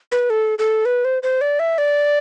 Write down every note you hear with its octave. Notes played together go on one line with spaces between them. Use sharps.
B4
A4
A4
B4
C5
C5
D5
E5
D5